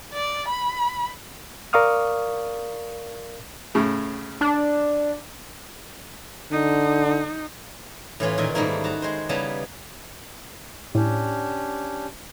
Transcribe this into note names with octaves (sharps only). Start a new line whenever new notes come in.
D5
B5
A#4 D5 F5 C#6 D#6 F6
A2 C#3
D4
D3 D#4
A2 E3 C#4 F4
A#2 D#3 A#3 A#4
G#2 D#3 G3 A3 A#3 E4
F#4 A5 A#5
G#3 C5
C#3 G3 B3 E4 A5 A#5
A2 C#4 D4 G4